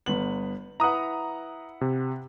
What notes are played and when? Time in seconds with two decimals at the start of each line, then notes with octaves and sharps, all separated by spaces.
0.06 G1 B3 F#7
0.80 E4 B4 F#5 A#5 D#6
1.81 C3